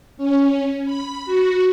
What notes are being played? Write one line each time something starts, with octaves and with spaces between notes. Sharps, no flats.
C#4
B5
F#4